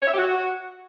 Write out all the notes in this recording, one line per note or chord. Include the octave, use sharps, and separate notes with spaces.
C#5
E5
G4
F#4